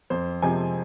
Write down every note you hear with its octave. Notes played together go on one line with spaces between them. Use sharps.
F2 C5
C3 F3 G#3 G#5